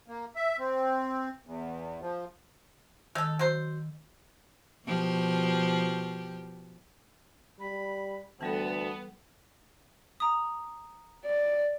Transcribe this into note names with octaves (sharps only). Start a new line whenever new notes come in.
A#3
E5
C4
E2
F3
D#3 G#3 A4 E6
F#3 C5
B2 F3 G4
G3 B5
D2 E3 G3 B3 A4 A5
A#5 D#6
D5